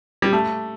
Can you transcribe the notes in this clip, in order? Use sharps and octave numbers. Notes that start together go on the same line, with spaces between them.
G3
A3